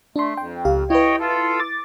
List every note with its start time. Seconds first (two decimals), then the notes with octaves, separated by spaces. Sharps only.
0.16 A3 D4 C6
0.37 F2 G5
0.65 C#2 G4 F5
0.90 E4 B4 C#5 D#5 G5
1.20 F4 A4
1.60 D6 A6